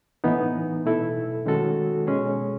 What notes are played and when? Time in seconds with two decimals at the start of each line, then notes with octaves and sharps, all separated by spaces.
0.24 A2 E3 B3 D#4
0.86 B2 A3 E4 A4
1.46 D#3 G#3 C#4 F#4 A4
2.07 B2 G#3 C#4 G#4